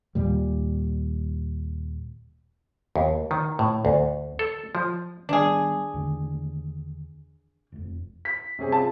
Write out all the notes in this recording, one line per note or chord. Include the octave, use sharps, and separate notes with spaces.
D#2 A#2 G3
D#2
D#3
A2
D2
A4
F3
D#3 G3 B3 D4 G#4
E2 D3 D#3
E1 F2
B6
C3 C#4 G#4
F4 G#4 A5